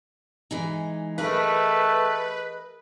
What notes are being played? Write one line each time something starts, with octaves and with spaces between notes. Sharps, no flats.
E3 G#3 D#4
A3 G#4 A#4 B4 D#5